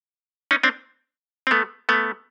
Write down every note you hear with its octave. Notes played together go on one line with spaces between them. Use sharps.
C#4 D#4
C4 D4
C4
A3 B3
A3 B3